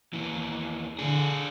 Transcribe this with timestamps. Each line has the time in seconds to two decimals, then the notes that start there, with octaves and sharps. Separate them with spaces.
0.13 D#2 E3
0.99 D3 D4 G#4